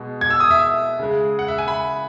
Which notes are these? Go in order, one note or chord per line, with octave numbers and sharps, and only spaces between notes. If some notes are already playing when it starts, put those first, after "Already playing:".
Already playing: B2 G#3
G#6
E6
D#6
E5
C#3 G#3
F#5
E5
G#5
B5